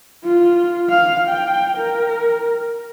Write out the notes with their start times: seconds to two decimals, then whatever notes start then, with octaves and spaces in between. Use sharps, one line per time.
0.24 F4
0.89 F5
1.29 G5
1.78 A#4